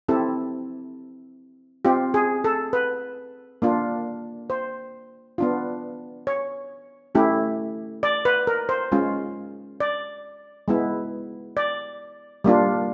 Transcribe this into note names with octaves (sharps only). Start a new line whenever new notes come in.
C4 E4 G4 A4
C4 F4 G4
G#4
A4
B4
A#3 D4 F4
C5
B3 D4 F4
C#5
A3 C#4 E4 G4
D5
B4
A#4
C5
G#3 C#4 F4
D5
G#3 B3 E4
D5
G3 A#3 D4 F4